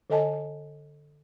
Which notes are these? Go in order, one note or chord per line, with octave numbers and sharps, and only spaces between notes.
D3 A4 D#5 G#5 A5